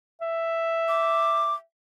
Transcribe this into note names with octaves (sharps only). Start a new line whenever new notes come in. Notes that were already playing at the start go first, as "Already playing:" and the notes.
E5
D6